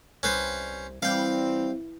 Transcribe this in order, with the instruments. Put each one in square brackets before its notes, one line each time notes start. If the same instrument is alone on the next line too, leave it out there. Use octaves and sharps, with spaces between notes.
[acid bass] C2 [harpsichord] C#4 B4 C5
[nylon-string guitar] E3 [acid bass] G3 [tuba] C4 [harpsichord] F5 G5